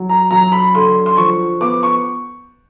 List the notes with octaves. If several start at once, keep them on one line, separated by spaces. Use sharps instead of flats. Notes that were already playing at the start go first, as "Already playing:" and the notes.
Already playing: F#3
A#5
F#3 A#5
B5
D3 C6
C6
F3 C#6
B3 D6
C#6